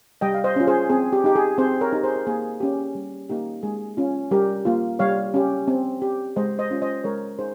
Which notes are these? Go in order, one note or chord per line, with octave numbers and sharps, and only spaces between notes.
G3 D#5 G5
F5
C5 D#5
C#4 F4
G#4 C5
C4 G#4
G4
D#4 G4
G#4
C4 G#4 C5
A#4 C#5
D#4 G4
G#4 C5
A#4
A#3 G#4
C#4 G4
G3
A#3 D#4 G4
G#3 G#4
C#4 F4
G3 G4 A#4
A#3 F4
G3 C#5 F5
C#4 G4
C4
G4
G#3 C5 D#5
C5 D#5
C#4 F4
C5 D#5
G#3 A#4 C#5
D#4 G#4 C5